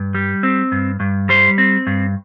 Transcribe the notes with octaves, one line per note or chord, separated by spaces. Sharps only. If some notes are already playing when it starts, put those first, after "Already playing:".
Already playing: G2
G3
C4
G2
G2
G3 C5
C4
G2